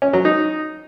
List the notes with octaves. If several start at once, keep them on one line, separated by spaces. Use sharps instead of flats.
C#4
F#3
D#4